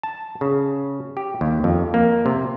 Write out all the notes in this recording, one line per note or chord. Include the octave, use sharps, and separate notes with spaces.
A5
C#3
G4
D#2
F2
A#3
C3